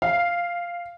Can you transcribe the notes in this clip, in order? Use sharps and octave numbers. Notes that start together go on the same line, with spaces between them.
F5